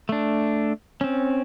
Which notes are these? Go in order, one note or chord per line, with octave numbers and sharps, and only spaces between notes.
A3 D4
C4 C#4